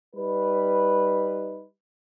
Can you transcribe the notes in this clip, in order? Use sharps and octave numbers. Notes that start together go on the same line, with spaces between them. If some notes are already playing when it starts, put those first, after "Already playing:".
G3 D#4 B4